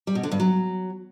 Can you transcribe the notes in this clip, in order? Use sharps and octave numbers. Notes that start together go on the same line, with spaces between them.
G3
B2
D3
G2
F#3